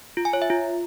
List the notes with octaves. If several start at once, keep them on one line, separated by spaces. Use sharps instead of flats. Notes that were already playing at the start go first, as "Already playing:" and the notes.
F4
G#5
C#5
E5
F4